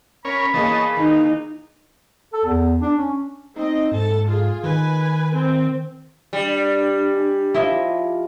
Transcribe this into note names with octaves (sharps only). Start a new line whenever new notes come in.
C#4 A#4 C#5 B5
E3 A#3 G#4 C#5 D#5 A5
D#3 D#4
A4
E2
D4
C#4
C4 D#4 D#5
G#2 A4 A5
F4 G#4
D#3 B4 G#5
C4
G3 D4
G#5
F3 E4 D#5 E5 D6